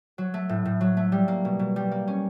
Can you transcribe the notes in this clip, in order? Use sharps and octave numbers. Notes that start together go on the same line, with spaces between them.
F#3
A3
A2
A2
F#3
A3
G3
A#3
B2
B2
G3
A#3
C#4